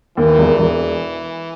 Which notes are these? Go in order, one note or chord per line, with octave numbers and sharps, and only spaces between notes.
D#2 E3
E1
E1